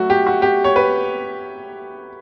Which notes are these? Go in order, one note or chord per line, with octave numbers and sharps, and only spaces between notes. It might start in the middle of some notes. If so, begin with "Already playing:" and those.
Already playing: F#3 A3 F#4
G4
F#4
G4
C#5
B4